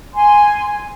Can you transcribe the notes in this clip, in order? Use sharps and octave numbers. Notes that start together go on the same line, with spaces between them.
G#5 C6